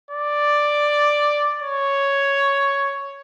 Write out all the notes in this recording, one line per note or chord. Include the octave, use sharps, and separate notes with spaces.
D5
C#5